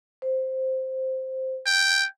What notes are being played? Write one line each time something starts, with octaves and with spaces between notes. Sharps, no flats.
C5
G5